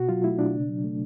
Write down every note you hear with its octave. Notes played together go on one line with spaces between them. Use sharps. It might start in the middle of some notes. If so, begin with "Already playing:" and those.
Already playing: B2 F#4
F#3 F4
A3 E4
B2 D4
C#3
F#3
A3